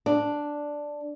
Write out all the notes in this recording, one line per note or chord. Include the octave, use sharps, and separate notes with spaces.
D4